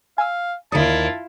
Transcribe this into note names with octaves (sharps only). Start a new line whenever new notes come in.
F5 G#5 E6
D#2 D3 E4 F4 D5 A5 D#6